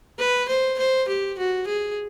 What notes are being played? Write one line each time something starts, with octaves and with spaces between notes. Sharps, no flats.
B4
C5
C5
G4
F#4
G#4